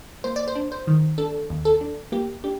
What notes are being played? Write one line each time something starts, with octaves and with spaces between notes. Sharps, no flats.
A#3 C5
D5
C5
D4
C5
D#3
D4 A4
D#2
A4
D4
A#3 G4
D4 G4